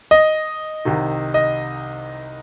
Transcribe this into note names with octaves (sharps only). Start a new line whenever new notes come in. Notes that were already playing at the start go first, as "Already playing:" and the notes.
D#5
C2 C3 D#3
D#5